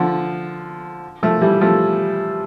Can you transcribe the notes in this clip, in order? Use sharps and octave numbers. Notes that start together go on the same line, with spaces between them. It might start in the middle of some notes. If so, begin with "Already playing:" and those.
Already playing: D3 F3
F3 A3
E3 G3
F3 A3